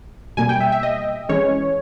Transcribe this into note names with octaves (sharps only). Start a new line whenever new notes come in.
B2 G3 A#3 G#5
G5
E5
E5
D#5
E3 G#3 C#4 C#5